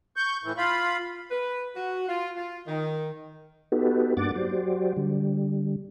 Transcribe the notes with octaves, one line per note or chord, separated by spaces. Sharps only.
C#6 G6
A2 E3
F4 F5 B5
B4
F#4
F4
F4
D#3
B3 D#4 F#4 G4 A4 B4
G2 A#3 D4 F#5 D6 A6
F#3 F#4 G4 C5 D5
D3 G3